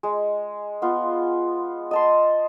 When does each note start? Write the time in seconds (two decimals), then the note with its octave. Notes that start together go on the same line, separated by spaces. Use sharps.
0.03 G#3
0.82 B3 F4
1.91 D#5 A5 C6